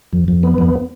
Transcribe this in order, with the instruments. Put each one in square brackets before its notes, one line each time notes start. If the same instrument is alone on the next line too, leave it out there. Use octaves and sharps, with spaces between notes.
[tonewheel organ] F2
F2
B3
F2